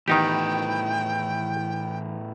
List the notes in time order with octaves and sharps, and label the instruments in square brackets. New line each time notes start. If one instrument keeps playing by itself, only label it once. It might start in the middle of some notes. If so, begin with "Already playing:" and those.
[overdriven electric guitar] A2 B3 [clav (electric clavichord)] D#3 D#4 G4 [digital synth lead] E3 [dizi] G5